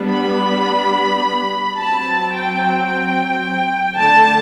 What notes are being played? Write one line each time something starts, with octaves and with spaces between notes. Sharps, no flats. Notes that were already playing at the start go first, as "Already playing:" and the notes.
Already playing: G3 B3 D4
B5
F#3 C4 A5
G5
G5
D3 A3 D4 A5